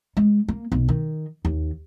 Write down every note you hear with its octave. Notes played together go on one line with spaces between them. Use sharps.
G#3
A#3
B1
D#3
D#2